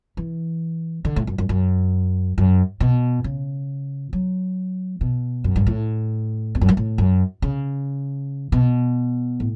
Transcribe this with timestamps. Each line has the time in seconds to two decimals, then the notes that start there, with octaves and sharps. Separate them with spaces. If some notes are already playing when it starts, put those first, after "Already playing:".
0.17 E3
1.05 D3
1.16 A2
1.27 F#2
1.38 F#2
1.49 F#2
2.38 F#2
2.80 B2
3.24 C#3
4.13 F#3
5.01 B2
5.44 F#2
5.56 G2
5.67 A2
6.55 E2
6.61 F#2
6.69 G2
6.77 A2
6.98 F#2
7.42 C#3
8.52 B2
9.40 A2